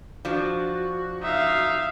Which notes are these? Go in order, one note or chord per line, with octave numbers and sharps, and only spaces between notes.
F3 D4 F#4
D#4 E5 F5